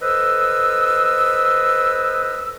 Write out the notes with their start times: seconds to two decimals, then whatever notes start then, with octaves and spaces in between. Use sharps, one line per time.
0.01 A4 B4 C5 D#5 E6